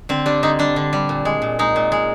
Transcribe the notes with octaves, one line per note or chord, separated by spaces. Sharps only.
D3 C4
G3 D4
D3 D#4
G3 D4
D3
G3
A#2
G#3
A#2
G#3 D#4
A#2
G#3